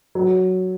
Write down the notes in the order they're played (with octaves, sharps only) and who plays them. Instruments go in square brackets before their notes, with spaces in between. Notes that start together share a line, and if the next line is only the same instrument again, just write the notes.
[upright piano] F#3